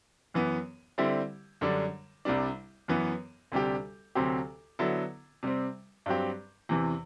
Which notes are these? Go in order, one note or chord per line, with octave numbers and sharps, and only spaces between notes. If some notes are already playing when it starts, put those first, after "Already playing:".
F#2 E3 B3
D3 G3 C4 E4 G4
F#2 D3 G3 D4
C2 C3 G3 D4
F#2 E3 B3
D2 C3 G3 D4 G4
D2 C3 F#3 C4 G4
D3 F#3 B3 E4 A4
C3 G3 C4
G2 F#3 C4 G4
E2 C3 E3